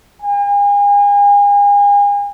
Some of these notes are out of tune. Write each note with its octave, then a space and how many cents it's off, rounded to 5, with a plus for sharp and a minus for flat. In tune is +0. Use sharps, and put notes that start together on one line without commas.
G#5 -40